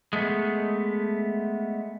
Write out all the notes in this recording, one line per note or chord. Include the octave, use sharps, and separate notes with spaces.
G#3 A3 B3